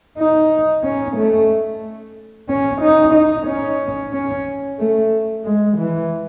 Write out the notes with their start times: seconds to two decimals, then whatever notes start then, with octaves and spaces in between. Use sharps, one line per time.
0.18 D#4
0.84 C#4
1.17 A3
2.49 C#4
2.82 D#4
3.14 D#4
3.47 C#4
4.13 C#4
4.79 A3
5.44 G#3
5.78 E3